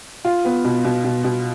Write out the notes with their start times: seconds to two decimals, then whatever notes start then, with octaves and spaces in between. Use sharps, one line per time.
0.25 F4
0.45 B3
0.65 B2
0.85 B2
1.04 B2
1.24 B2